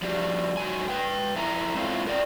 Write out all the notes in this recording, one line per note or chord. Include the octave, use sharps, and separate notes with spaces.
F3 G3 D4 G4
G#2 F#3 G#5
B4 G5
F2 E4 A5 A#5
G#3 C4 E4 F4 C5 F5
A#4 D5 F#5 G5